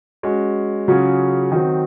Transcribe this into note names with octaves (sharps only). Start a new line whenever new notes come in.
G#3 C#4 F#4
C#3 F#3 C#4 F4 G#4
D#3 F#3 C4